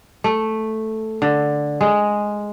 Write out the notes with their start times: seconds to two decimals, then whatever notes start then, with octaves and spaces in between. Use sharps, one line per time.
0.24 A3
1.22 D3
1.81 G#3